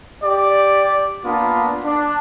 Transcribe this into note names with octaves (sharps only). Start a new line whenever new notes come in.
G4 D5
A#3 B3 D4 F4
D4